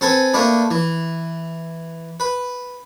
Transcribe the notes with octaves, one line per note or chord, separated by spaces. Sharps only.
C4 A4 B4 G#5
A3 A#3 D4 B4
E3
B4